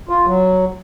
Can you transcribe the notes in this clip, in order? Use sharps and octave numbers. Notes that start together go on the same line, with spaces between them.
F4
F#3